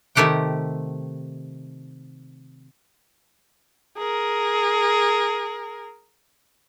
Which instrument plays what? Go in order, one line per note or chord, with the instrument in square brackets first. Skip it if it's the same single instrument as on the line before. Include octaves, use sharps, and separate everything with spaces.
[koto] C3 D#3 A3 G4 F#5 G5
[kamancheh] G#4 A#4